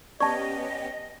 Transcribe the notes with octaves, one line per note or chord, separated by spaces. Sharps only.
B3 C#4 G4 D5 D#5 A5 C#6